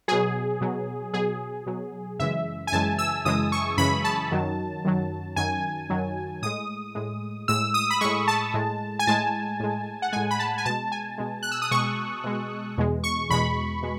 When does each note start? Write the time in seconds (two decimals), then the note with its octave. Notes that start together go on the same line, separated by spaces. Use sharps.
0.08 B2 F#3 G#4
0.61 B2 F#3
1.14 B2 F#3 G#4
1.66 B2 F#3
2.19 F#2 C#3 E3 G#3 E5
2.67 G#5
2.72 F#2 C#3 E3 G#3 A5
2.98 E6
3.25 F#2 C#3 E3 G#3 D#6
3.52 C#6
3.78 F#2 C#3 E3 G#3 B5
4.04 A5
4.31 F#2 D#3 F#3
4.84 F#2 D#3 F#3
5.36 F#2 D#3 F#3 G#5
5.89 F#2 D#3 F#3
6.42 A2 G#3 D#6
6.95 A2 G#3
7.48 A2 G#3 E6
7.74 D#6
7.90 B5
8.01 A2 G#3 C#6
8.28 A5
8.54 A2 G#3
8.99 G#5
9.07 A2 G#3 A5
9.60 A2 G#3
10.02 F#5
10.12 A2 G#3 G#5
10.31 B5
10.39 A5
10.58 G#5
10.65 B2 G#3 A5
10.92 G#5
11.18 B2 G#3
11.43 F#6
11.52 E6
11.62 D#6
11.71 B2 G#3 C#6
12.24 B2 G#3
12.78 E2 B2 G#3
13.04 C#6
13.30 E2 B2 G#3 B5
13.83 B2 G#3